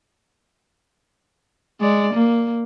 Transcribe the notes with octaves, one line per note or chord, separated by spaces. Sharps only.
G#3 D5
A#3